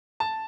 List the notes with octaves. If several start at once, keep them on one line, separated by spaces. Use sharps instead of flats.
A5